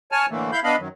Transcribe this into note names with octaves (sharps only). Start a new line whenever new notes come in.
C#5 G#5 A5 F6
A2 D3 E3 A3 A#3
E4 F5 B5 G6
B3 D4 D#5 F5 B5
F#2 D#3 F#3